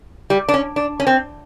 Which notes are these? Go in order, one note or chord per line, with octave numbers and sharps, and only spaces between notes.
G3
D4
C#4
D4
C#4
C4